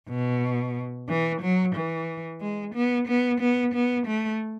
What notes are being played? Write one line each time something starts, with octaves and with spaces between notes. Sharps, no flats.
B2
E3
F#3
E3
G#3
B3
B3
B3
B3
A3